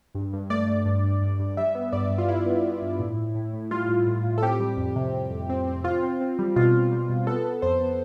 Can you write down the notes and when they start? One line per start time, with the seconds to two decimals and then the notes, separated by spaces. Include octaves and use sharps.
0.15 G2
0.33 G2
0.50 A3 D5
0.68 A3
0.85 G2
1.03 G2
1.22 G2
1.39 G2
1.57 G3 E5
1.75 B3
1.93 G2 D5
2.10 G2
2.18 F4
2.28 G2 E4
2.46 B3
2.64 B3
2.82 G2
3.00 A2
3.17 A2
3.35 A2
3.53 A2
3.71 G3 F4
3.89 A2
4.07 A2
4.24 A2
4.38 A4
4.42 C4 G4
4.60 G3
4.77 F2
4.96 C3
5.14 C3
5.31 F2
5.49 C4
5.67 C4
5.84 C4 F4
6.03 C4
6.21 C4
6.39 G3
6.56 B2 F4
6.74 B2
6.92 G3
7.09 B2
7.27 B3 A4
7.45 B3
7.62 F2 C5
7.81 B3